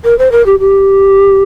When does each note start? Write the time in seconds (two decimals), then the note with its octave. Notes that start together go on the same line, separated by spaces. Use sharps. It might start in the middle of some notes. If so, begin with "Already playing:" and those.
0.05 A#4
0.19 C5
0.32 A#4
0.46 G4
0.60 G4